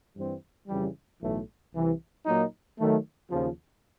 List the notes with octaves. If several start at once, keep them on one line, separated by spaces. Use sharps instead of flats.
G2 E3 G3 C4
F2 C#3 E3 G3
B1 A2 E3 A3
C2 C3 E3
A#2 F#3 A#3 D#4
D#3 F#3 A3
D#2 C#3 F3